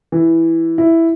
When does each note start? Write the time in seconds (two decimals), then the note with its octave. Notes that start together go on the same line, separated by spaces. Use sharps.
0.12 E3
0.78 E4